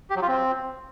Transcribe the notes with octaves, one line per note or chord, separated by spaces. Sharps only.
G4
F#3
F4
C4